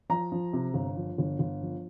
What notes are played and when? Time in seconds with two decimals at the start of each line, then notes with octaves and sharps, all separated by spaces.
0.10 F3 A#5
0.32 F3
0.53 C3
0.74 G1
0.96 F3
1.18 G1
1.39 G1
1.61 F3